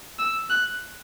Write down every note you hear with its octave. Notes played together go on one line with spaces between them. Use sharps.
E6
F#6